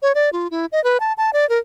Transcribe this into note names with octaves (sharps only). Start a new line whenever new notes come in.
C#5
D5
F4
E4
D#5
B4
A5
A5
D5
A#4